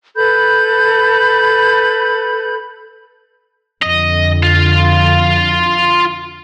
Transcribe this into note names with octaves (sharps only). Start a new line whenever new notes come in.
A4 B4 B5 G6
F2 D3 D#5
F4